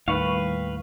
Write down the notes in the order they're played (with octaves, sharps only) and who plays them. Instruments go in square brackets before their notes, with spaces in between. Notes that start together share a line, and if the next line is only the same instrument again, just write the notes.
[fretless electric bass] D#2 A2 [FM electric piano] D#3 C#6 [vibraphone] G3 [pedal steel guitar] B4 F5